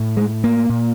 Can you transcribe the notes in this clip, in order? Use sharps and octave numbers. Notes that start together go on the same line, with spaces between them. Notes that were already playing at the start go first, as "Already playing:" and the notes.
Already playing: A2
G#3
A#3
A#2